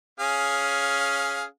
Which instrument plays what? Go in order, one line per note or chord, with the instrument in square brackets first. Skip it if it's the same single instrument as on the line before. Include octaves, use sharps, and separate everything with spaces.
[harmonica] C#4 G#4 F5